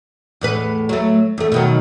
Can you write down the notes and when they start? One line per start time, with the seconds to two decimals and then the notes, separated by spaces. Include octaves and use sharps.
0.41 E2 A2 B4
0.89 F#3 A3
1.38 E2 A3
1.52 B2 D#3 F#3